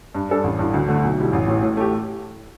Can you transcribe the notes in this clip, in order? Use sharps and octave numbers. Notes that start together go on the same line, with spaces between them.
G2
G3 D4 A4
A1
G2 E3
D2
D3 A3
B1
B2 G3 E4
A1
A2 E3
A2
A3 G4